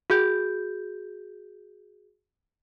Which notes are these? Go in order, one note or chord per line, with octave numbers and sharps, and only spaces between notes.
F#4 G#4 G6